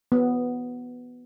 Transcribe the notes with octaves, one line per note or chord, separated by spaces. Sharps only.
B3